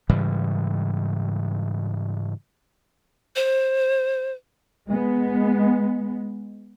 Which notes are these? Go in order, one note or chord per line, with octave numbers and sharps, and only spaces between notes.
G#2 C#3 E3 G3
C5
G#3 B3